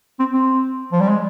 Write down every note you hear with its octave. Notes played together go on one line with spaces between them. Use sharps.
C4
C4
F3
G3
G#3